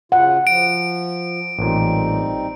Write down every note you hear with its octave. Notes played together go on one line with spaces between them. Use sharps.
C#3 F4 F#5
F3 D7
A1 A#2 G3 C4 D#4